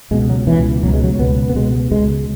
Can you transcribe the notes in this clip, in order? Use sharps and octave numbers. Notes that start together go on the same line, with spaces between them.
C#2 B2 G#3
F#3
C#2 B2 E3
C#2 B2 F#3
G#3
F#3
C#2 B2 B3
B3
C#2 B2 G#3
C#2 C#3 G#3